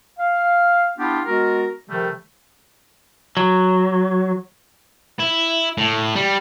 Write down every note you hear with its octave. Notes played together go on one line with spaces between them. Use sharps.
F5
B3 D4 E4 F4 G4
G#3 B3 F#4 A#4
C3 D#3 F3 G3 A3
F#3
E4
A2
G3